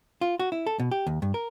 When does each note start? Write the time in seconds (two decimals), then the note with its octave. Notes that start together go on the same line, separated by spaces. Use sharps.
0.21 F4
0.40 F#4
0.52 E4
0.67 A4
0.80 B2
0.91 G4
1.07 D#2
1.22 G2
1.34 A#4